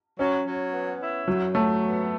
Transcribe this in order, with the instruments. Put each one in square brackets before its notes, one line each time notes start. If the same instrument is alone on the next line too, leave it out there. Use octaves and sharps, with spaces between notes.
[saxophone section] F#3 [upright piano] C#4
[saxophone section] F#3
B3
E4
[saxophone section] F#2 [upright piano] F#3
[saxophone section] F#3 [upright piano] A3
[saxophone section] B3